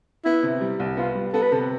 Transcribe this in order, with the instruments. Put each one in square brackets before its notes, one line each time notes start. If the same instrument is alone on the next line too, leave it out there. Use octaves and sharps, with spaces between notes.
[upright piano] B3 [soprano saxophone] E4
[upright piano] C3
G3
C2
[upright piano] B3 [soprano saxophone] F4
[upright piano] G3
[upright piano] B3 [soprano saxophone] A4
[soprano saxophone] B4
[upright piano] C3 [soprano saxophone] A4